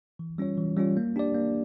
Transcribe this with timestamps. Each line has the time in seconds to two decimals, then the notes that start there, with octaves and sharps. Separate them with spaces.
0.19 E3
0.38 G3 C#4 F4 C#5
0.58 E3
0.77 G3 C#4 F4 C#5
0.97 A#3
1.16 D4 G4 D5
1.35 A#3